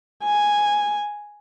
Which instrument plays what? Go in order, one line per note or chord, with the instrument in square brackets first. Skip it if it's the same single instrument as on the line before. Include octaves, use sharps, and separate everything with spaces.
[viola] G#5